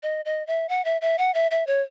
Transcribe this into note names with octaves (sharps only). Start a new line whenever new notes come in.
D#5
D#5
E5
F#5
E5
E5
F#5
E5
E5
C#5